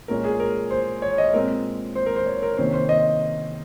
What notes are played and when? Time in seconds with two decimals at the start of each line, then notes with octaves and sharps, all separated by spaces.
0.08 A#2 G#3 C#4 A#4
0.24 G#4
0.40 A#4
0.71 C5
1.02 C#5
1.18 D#5
1.34 A#2 G#3 C4 A#4
1.95 C5
2.06 A#4
2.16 C5
2.26 C#5
2.42 A#4
2.57 C3 D#3 A#3 C#4 C5
2.73 C5
2.89 D#5